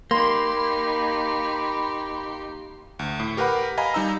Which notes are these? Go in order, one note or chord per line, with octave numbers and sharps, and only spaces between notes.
A#3 D#4 G4 B5 C6
D2
A2
G4 A#4 B4 F#5 B5
D#5 F5 G#5 A#5 B5
G3 D#4 A#5 E6